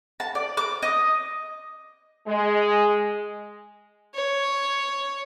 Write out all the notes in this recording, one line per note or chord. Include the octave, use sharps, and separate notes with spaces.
A5
D5
D6
D#5
G#3
C#5